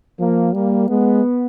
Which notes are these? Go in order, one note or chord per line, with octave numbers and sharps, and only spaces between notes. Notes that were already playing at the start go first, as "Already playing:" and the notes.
F3 A#3
G3 A#3
G#3 B3